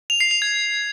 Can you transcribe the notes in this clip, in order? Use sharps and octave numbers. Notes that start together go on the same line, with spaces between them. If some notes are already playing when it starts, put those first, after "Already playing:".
F7
C7
F7
G#6